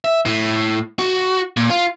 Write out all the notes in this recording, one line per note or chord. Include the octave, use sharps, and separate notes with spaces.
E5
A2
F#4
A#2
F4